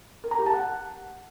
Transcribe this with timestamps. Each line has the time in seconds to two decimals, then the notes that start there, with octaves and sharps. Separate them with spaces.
0.24 A#4
0.31 A#5
0.39 G4
0.46 A5
0.54 F#5